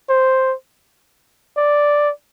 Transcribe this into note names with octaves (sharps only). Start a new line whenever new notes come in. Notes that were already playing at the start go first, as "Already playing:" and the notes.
C5
D5